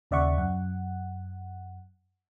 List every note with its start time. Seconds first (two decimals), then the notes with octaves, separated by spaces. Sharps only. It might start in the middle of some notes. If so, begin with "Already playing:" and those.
0.11 D#2 C#3 D5 E5 F#5 C#6
0.38 F#2 F#5